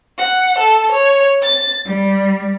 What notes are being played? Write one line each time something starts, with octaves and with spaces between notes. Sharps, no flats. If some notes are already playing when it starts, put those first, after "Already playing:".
F#5
A4
C#5
A6
G3